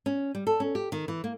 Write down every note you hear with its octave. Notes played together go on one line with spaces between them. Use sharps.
C#4
G3
A4
C#4
G4
D#3
E3
A#3